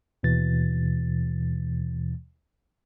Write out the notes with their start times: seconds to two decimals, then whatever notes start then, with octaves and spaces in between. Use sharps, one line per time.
0.23 D#2 B2 E3 A6